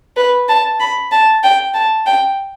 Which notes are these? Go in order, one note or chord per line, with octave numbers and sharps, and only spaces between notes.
B4
A5
B5
A5
G5
A5
G5